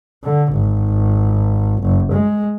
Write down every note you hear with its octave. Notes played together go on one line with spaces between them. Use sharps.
D3
G#1
F#1
G#3